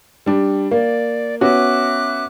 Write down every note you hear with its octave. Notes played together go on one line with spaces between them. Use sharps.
G3 D4
A#3 D5
B3 C#4 F#4 E5 D6 F#6